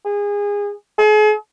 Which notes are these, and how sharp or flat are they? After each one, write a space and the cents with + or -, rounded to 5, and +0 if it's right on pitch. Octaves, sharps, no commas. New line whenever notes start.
G#4 -25
G#4 +40